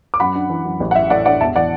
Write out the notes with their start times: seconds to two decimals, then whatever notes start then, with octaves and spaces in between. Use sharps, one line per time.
0.14 D6
0.20 F#2 F#5 B5
0.35 D4
0.50 E3
0.65 F#2
0.80 A1
0.91 F#5
0.95 E3 E5
1.10 A2 D5 F#5
1.25 D4 D5 F#5
1.41 E1 E5 A5
1.55 E3 D5 F#5